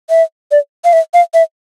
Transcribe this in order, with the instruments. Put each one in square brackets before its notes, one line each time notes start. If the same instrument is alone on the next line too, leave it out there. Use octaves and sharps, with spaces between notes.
[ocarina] E5
D5
F5
E5
F5
E5